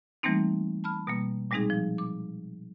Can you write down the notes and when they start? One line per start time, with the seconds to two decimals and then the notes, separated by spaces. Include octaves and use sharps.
0.23 E3 G3 A3 A#3 C4 D#4
0.84 A5 B5 F6
1.07 B2 G3 A#3
1.51 A#2 G3 G#3 C4 D#4 G#4
1.70 F3
1.98 D6